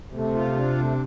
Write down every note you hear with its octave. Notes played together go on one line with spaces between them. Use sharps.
C3 A3
F4
D4
A3